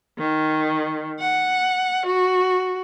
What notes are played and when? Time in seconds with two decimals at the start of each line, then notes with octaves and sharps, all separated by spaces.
0.18 D#3
1.19 F#5
2.06 F#4